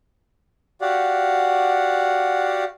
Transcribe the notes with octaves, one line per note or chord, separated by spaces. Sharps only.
F#4 G4 D5 F5 F#5